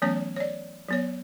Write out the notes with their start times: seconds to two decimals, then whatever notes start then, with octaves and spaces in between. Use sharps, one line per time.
0.02 E3 F#3 A3 B3 C#4 C#5
0.36 C#5 D5
0.89 F#3 B3 C#5